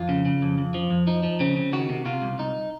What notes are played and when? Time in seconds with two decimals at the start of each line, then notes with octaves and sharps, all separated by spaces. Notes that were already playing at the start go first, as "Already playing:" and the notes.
Already playing: F2 F4
0.09 C#3
0.25 C#3
0.42 F2
0.58 F2
0.74 F3
0.90 F2
1.07 F3 D#4
1.23 F3
1.40 C#3 C4
1.56 C#3
1.73 D#3 F#4
1.89 C3
2.05 C3 F4
2.22 C2
2.39 C2 D#4